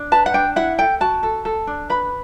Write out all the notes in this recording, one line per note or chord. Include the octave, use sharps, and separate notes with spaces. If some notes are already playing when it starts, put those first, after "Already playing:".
Already playing: D4
B4 A5
F#5
D4 G5
E4 F#5
A4 G5
F#4 A5
A4
A4
D4
B4 B5